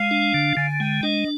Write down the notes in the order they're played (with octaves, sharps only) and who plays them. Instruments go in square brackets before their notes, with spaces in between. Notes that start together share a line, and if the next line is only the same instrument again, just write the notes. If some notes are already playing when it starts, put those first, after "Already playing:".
Already playing: [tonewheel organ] G#3 [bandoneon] F5
[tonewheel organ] D4
D3
[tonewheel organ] D3 [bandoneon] G#5
[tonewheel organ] G#3 [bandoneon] G5
[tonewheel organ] D4 [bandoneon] D#5